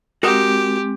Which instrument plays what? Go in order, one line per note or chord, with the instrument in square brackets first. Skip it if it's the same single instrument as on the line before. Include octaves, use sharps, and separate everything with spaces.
[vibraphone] G#3 C4 [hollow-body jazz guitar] F#4 A#4 D#5 [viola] G4